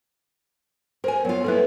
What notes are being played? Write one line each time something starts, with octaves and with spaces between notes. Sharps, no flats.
A#4 C5 G#5
F#3 B3 F4
A#3 B3 E4 A4 B4